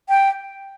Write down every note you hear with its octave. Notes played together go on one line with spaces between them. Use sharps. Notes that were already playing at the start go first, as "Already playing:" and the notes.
G5